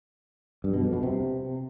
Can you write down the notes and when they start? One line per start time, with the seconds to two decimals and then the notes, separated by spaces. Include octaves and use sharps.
0.64 G2
0.74 B2
0.83 F2
0.93 B2
1.03 C3